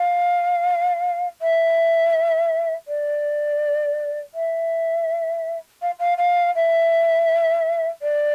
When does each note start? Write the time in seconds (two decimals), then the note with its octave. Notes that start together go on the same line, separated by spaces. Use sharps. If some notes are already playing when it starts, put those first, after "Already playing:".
Already playing: F5
1.41 E5
2.87 D5
4.34 E5
5.81 F5
5.99 F5
6.17 F5
6.55 E5
8.02 D5